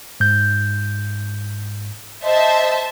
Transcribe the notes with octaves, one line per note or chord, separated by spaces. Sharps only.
G#2 G6
C5 D#5 E5 A5